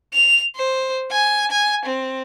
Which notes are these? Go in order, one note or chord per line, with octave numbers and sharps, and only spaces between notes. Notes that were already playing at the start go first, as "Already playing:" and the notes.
F7
C5
G#5
G#5
C4